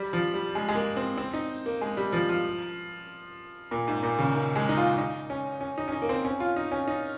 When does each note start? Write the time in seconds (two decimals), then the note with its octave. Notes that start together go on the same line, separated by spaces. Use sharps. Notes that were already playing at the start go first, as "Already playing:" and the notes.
Already playing: G3
0.13 F3
0.34 G3
0.55 G#3
0.69 G#3
0.75 A#3
0.97 C4
1.18 C4
1.34 D#4
1.66 A#3
1.81 G#3
1.97 G3
2.12 F3
2.29 F3
3.71 A#2
3.88 G#2
4.03 A#2
4.19 C#3
4.35 D#3
4.56 G#3
4.69 D#4
4.77 F4
4.98 D#4
5.30 C#4
5.61 C#4
5.78 D#4
5.88 C#4
5.92 D#4
6.02 A#3
6.09 C4
6.25 C#4
6.40 F4
6.56 D#4
6.72 C#4
6.88 D#4